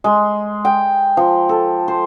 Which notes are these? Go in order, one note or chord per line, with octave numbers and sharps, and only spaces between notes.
G#3
G5
F3
A4
C5